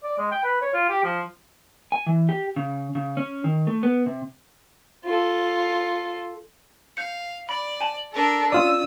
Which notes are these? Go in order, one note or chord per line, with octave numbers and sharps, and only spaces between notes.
D5
G#3
G5
B4
C#5
F4
G4
F3
G#5
E3
G4
C#3
C#3
C#4
D#3
A3
B3
C3
F4 A4
F5 G6 C#7
D5 B5
G#5 A5
D4 A4 A#4
C#4 F4 D5 D#6 E6